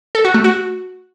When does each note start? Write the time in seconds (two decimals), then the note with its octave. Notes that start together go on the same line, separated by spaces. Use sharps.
0.15 A4
0.25 F#4
0.34 A3
0.44 F#4